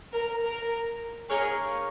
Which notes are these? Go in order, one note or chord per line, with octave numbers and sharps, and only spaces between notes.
A#4
A#4
A#3 D#4 G#4 A#4 C#5